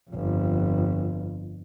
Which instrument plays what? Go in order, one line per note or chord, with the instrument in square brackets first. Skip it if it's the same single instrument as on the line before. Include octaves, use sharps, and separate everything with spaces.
[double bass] G1 F2